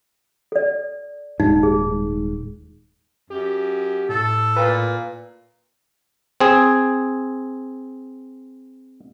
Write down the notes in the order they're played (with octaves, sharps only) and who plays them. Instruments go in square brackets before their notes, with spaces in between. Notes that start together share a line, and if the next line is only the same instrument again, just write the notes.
[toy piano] A4 D5
[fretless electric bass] D#1 G#2 [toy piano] D#4
[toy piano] G#4
[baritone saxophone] F#2 [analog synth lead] G4
[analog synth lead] A2 [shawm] A4
[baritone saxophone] A#2 [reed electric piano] B4
[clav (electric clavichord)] C4 G#4